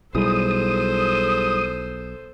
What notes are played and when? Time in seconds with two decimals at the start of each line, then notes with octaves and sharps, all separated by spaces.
0.15 B1 G3 E4 G#4 A4 C5 D#6